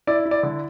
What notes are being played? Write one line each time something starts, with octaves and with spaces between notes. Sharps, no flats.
E4 D5
E4
D5
D3